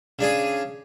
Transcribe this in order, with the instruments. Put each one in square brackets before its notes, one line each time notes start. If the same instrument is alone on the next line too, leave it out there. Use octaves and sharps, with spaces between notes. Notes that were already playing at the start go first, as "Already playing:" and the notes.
[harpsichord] C#3 D4 G#4 D#6